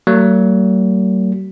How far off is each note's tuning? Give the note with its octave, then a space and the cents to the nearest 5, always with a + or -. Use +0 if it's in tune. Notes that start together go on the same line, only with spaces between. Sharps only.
F#3 +45 A#3 -45